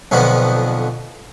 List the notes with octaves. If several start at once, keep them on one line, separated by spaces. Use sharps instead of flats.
B1 F2 B2 D3 F3 B3